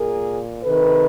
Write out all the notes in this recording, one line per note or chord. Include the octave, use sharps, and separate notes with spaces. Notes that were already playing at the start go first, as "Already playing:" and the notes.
Already playing: A#2 G#4 A#4
C3 D#3 A4 B4